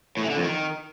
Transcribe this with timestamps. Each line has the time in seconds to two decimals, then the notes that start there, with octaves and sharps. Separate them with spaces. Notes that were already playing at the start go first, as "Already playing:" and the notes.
0.17 A2
0.23 E3
0.30 D3
0.36 F2
0.43 D#3